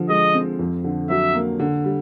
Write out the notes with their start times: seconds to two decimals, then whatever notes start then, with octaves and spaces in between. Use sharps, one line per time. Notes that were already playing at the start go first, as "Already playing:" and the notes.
Already playing: D3 F3
0.09 G#3 D#5
0.34 C4
0.59 F2
0.84 D3
1.09 F#3 E5
1.35 A#3
1.60 D3
1.84 G3